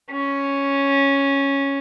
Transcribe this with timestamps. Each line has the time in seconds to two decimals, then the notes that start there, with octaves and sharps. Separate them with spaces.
0.11 C#4